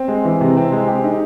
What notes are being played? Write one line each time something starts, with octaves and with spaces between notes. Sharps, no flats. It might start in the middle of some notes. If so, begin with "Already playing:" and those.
Already playing: C4
G#3
E3
C3
C4
G#3
G4
D#4